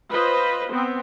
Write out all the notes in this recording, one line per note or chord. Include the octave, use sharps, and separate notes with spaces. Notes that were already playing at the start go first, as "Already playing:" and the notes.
F4 B4 C5 D#5
B3 C4